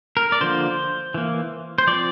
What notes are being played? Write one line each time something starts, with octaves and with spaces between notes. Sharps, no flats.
A#4
D5
D3 F3 A#3 C5
E3 A#3
C5
F3 C4 D5